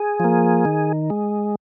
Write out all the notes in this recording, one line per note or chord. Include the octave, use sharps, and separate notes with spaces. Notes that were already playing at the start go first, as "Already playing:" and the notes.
Already playing: G#4
F3 A#3
D#3
G#3